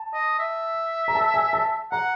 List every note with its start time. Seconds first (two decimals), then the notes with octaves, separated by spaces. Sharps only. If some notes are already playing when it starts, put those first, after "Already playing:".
Already playing: A5
0.13 D#5
0.39 E5
1.08 A#5
1.15 A5
1.34 G#5
1.53 A5
1.91 F#5 A#5